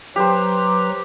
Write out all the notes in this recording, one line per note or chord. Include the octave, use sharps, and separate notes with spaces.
F#3 G4 B4 C5 A#5